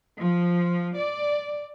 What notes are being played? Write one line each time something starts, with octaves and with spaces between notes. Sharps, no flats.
F3
D5